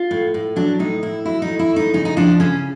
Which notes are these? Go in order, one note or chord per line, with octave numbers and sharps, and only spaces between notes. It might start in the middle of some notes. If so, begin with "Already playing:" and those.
Already playing: F4
A2
A2
F#3 D4
A2 D#4
A2 E4
F#3 E4
D#4
A2
E4
A2
D#4
C#3 D#4
D#4
F3 D4
C#3 C#4